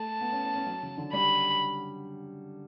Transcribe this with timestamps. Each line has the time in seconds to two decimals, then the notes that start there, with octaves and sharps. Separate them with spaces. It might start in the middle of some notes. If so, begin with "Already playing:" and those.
Already playing: A3 A5
0.21 B3
0.32 C#4
0.44 C#4
0.56 C#4
0.67 F#3
0.83 C#3
0.98 D3
1.13 G3 B5